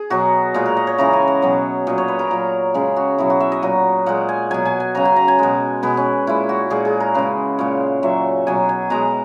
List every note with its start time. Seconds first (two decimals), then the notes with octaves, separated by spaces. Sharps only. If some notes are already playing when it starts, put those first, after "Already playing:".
Already playing: G#4
0.10 B2 F#3 F#4
0.54 A#2 G#3 G#4
0.66 A#4
0.77 D#5
0.87 C#5
0.98 C#3 E3 G#3 A#5
1.13 G#5
1.28 F#5
1.42 B2 F#3
1.87 A#2 F#3 D#5
1.98 C#5
2.08 B4
2.19 A#4
2.31 A#2 F#3
2.74 C#3 G#3 G#4
2.96 F#4
3.18 B2 F#3 E4
3.30 F#4
3.40 E5
3.52 D#5
3.62 A#2 F#3
4.06 A#2 G#3 F#5
4.29 G#5
4.51 B2 F#3 G#5
4.65 G#5
4.80 G#5
4.95 C#3 F#3 A#5
5.05 G#5
5.16 A#5
5.28 G#5
5.39 B2 G#3
5.83 B2 G#3 B4
5.97 C#4
6.27 A#2 G#3 E4
6.49 F#4
6.70 A#2 G#3 G#4
6.85 G#4
7.00 A#4
7.15 C#3 G#3 B4
7.58 A#2 G#3 C#5
8.03 A#2 F#3 E5
8.47 B2 F#3 G#5
8.69 G#5
8.90 B2 G#3 A#5